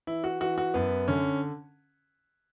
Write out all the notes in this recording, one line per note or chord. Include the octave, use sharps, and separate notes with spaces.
E3 E4
F#4
E3 F#4
F#4
F#2 B3
D3 C#4